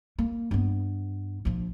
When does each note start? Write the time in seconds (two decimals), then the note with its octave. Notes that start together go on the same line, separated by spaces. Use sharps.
0.19 A#3
0.51 G2 B3
1.45 A#1 F3